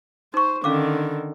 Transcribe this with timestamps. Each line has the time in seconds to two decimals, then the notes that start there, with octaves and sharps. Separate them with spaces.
0.34 D#4 C5 C#6
0.64 D3 D#3 C#4 F5 D6